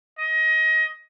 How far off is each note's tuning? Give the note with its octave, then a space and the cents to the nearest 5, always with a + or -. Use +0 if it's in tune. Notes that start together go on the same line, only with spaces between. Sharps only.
D#5 +25